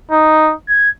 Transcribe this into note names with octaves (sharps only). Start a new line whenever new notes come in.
D#4
G#6